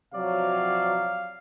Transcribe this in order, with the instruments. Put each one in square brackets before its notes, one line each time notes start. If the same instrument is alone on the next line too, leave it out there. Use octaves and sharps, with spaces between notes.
[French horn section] C3 F3 F#3 [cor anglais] D5 [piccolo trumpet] F5